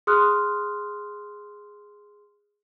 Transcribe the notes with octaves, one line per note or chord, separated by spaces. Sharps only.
G#4 C6 D#6 F6 F#6